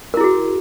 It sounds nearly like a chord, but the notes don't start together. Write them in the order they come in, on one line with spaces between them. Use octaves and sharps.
A#4 E4 G#4 F#4